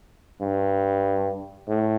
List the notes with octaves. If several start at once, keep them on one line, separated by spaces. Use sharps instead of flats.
G2
A2